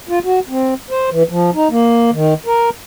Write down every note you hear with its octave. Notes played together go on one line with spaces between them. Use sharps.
F4
F#4
C4
C5
E3
F3
D#4
A#3
D#3
A#4